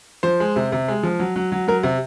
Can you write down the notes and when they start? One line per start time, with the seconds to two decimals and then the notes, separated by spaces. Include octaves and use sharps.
0.23 F3 C5
0.40 G#3
0.56 C3
0.72 C3
0.88 G#3
1.03 F3
1.19 F#3
1.36 F#3
1.52 F#3
1.68 F#3 A#4
1.83 C3